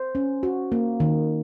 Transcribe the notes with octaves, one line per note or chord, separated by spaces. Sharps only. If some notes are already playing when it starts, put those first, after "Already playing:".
Already playing: C5
C#4
F#4
A#3
D#3